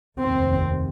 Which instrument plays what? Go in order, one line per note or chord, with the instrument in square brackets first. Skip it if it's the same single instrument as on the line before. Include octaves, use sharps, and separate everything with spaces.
[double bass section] F1 D#2 C4